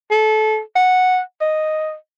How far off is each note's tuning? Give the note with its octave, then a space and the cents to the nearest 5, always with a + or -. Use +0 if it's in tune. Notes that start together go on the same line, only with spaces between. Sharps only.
A4 -25
F#5 -5
D#5 +0